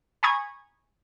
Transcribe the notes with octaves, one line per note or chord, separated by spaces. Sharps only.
G#5 A#5 B5 C#6 D#6 G#6